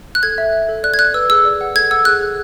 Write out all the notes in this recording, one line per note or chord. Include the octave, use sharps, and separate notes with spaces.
F#6
A4 G#6
E5
E5
A4
D5 F#6
G#6
D5 F#6
B4 E6
G#4 E6
D5
F#5
A4 G#6
F#5 E6
G#4 F#6
G#4